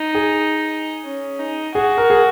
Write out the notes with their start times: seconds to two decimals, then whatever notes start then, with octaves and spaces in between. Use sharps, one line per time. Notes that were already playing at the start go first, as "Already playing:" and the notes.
Already playing: D#4
0.15 G#4
1.05 C#4
1.40 D#4
1.75 F#4 G#4
1.98 A#4
2.10 G#4